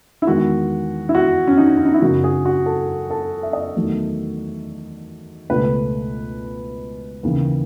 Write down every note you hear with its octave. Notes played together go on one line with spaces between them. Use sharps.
E4
E2 D#3 G#3 F#4
E4
F#4
C#4
D#4
C#4
D#4
E4
F#2 C#3 F#3 F#4
G#4
F#4
A4
A4
E5
D#5
E2 D#3 F#3 A3
C#2 B2 A3 B4
D#2 C#3 E3